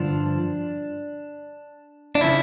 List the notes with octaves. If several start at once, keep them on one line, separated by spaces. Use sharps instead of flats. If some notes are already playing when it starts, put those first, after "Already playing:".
Already playing: G2 D3 F3 D4
D4
C#3 F3 E4